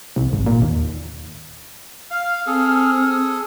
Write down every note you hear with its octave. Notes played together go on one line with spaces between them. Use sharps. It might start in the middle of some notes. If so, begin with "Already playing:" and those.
C2
G#1
A#2
D#2
F5 F6
C4 G#4 A4